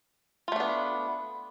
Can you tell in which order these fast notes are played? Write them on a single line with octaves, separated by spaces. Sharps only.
F4 A3 D4 B3